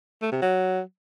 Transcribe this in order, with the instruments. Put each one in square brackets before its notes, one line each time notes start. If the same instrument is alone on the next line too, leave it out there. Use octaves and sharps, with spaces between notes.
[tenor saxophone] A3
C3
F#3